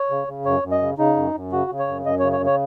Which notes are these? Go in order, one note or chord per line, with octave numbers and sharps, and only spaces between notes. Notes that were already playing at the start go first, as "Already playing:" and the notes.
Already playing: C#5
C#3
C#3
F#2 C#5
F#2
D#5
C#3
C#3 D#4
F#2
F#2
C#3 F#4
C#3
C#5
F#2
F#2 D#5
C#3 C#5
C#5
C#3
C#5